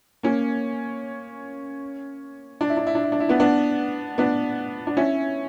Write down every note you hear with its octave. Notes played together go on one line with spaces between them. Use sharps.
A#3 C#4
D4
E4
D4
E4
D4
E4
D4
E4
B3 D4
B3 D4
B3 D4
D4
C#4 E4